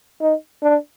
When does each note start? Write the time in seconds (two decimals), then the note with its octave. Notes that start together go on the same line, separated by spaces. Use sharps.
0.21 D#4
0.63 D4